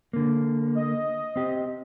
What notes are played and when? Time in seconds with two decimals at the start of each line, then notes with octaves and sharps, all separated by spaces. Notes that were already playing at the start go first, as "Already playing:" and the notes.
0.13 D3 A#3
0.77 D#5
1.36 C4 G4